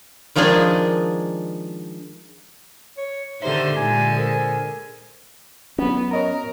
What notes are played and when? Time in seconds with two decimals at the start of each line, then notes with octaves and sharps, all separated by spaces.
0.36 D#3 F3 G#3 D4 G#4
2.98 C#5
3.42 D3 D#3 D#4 G4 C5 E5
3.76 A#2 D3 G#3 G#5
4.17 G#4 A#4 C5 G#5
5.78 F#3 B3 C#4
6.11 A#4 C#5 D#5 A#5